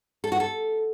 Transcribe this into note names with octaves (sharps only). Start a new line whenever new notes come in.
A4
F#4
A4